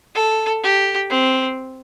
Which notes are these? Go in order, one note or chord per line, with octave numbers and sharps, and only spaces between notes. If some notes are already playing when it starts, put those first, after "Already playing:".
A4
G4
C4